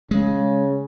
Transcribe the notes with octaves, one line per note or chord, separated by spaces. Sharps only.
C#3 G#3